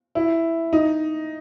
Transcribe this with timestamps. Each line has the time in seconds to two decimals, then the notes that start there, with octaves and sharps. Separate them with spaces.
0.15 E4
0.73 D#4